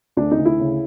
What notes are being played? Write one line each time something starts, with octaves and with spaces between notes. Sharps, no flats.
D2 D4
D#4
D2
E4
C#3